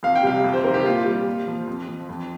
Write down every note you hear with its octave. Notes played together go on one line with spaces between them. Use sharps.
F2 F5
G5
C3 G3 F5
F2
C5
C3 D#3 G3 A#4
G4
A#2 F4
G3
A#2
F3
F2
F3
F2